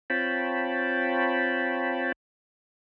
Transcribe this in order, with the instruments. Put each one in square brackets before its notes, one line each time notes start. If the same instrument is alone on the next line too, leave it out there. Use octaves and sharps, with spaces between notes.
[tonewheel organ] C4 F4 C#5 G5 A5 B5